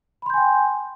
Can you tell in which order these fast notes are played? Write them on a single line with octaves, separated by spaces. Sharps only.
B5 C6 G6 G#5 G5